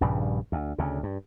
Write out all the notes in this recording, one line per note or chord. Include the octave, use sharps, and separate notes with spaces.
A#1 G2 C#3 G3
D2
D2 C#3
G2